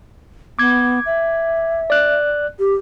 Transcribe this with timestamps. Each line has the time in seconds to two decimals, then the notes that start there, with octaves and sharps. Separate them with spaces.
0.59 B3 D6 G#6
1.06 E5
1.90 D5 F#6
2.59 G4